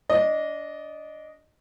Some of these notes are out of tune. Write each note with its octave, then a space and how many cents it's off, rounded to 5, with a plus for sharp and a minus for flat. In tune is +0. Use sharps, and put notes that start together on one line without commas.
D4 -25 D#5 -5